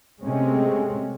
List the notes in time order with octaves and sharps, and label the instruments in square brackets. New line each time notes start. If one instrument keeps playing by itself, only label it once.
[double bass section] C3 G#3 A3 C4 C#4